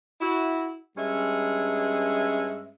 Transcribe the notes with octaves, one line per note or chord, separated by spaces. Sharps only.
E4 F#4
G2 G#3 C#4 E5